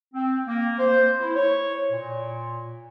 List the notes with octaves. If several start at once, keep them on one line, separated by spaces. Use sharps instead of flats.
C4
A#3
C5
E4
C#5
A#2